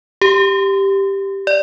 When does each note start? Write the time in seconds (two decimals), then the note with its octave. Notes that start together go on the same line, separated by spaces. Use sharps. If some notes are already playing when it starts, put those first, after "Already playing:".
0.22 G4
1.47 D5